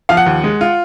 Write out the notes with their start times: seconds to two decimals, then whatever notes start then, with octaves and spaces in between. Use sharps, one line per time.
0.09 F3 F5
0.17 F#5
0.26 D#2
0.44 G#3
0.61 F4